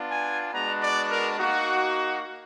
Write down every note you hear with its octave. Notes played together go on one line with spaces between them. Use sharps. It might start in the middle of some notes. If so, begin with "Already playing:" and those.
Already playing: B3 D4 F4
G#5
G#3 B3 D4 F#4 A#5
D5
A#4
A#3 D#4 F#4